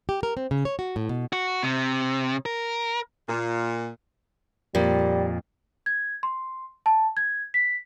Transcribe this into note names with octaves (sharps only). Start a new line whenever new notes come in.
G4
A#4
C4
C#3
C#5
F#4
A2
B2
F#4
C3
A#4
A#2
F2 A#2 G3
G#6
C6
A5
G#6
B6